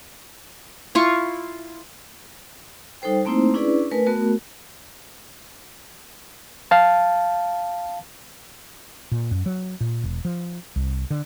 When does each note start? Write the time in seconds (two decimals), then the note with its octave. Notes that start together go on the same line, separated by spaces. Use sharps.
0.95 E4 F4 C#6
3.02 G3 D#4 A4 C5 G5
3.25 A3 A#3 C4 D#4 E4 C5
3.54 C#4 D4 E4 G#4 B4 D5
3.92 A3 A#4 B4 G#5
4.07 A3 B3 F#4 A#4
6.71 F5 A5
9.12 A#2
9.31 F#2
9.46 F#3
9.81 A#2
10.04 E1
10.25 F3
10.76 C2
11.10 D3